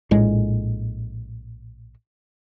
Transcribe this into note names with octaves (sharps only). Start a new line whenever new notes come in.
A#1 A2 G#3